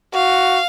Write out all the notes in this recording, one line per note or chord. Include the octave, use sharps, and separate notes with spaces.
F#4 F5